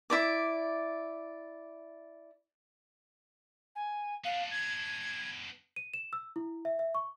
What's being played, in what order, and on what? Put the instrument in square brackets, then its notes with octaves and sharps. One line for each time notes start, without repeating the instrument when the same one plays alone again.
[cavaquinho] E4 D5 D6
[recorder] G#5
[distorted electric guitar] B3 D4 [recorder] F5
[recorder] G#6
[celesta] D#7
E7
E6
E4
E5
E5
C#6